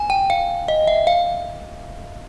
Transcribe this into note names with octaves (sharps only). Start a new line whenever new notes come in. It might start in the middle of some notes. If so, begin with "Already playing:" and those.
Already playing: G#5
G5
F5
D#5
E5
F5